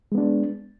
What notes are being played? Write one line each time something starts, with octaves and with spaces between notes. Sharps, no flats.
G#3 B3 D4